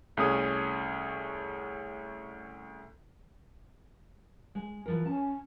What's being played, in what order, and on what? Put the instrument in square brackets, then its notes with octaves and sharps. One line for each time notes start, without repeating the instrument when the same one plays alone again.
[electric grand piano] C2 A3 C#4 G#4 D#6
[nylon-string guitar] G#3
E3 F3 A#4
[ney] C#4 [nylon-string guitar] A5